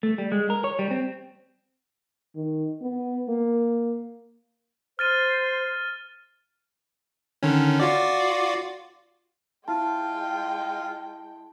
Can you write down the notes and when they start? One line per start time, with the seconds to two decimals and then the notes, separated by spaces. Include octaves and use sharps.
0.03 A3
0.18 G3
0.32 G#3
0.50 A#4
0.64 C#5
0.79 G3
0.91 C4
2.36 D#3
2.82 B3
3.29 A#3
4.99 C5 F6 A6 D#7
7.43 D3 D#3 C#4
7.80 F4 F#4 D5
9.68 G#3 E4 F4 G5 A5